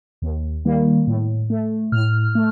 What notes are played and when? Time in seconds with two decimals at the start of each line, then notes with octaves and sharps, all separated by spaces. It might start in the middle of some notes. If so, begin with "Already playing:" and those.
0.22 D#2
0.65 D#3 G3 A#3
1.07 A2
1.50 A3
1.92 A2 F6
2.35 A3